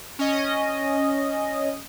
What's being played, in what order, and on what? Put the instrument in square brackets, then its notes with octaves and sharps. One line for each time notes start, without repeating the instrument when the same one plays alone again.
[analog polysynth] C#4 D#5